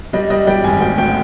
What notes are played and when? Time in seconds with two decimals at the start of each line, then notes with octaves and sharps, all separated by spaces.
0.13 G3 D#5
0.30 G3 D#5
0.47 G3 G5
0.64 G#1 G#5
0.81 D2 G5
0.98 D2 G5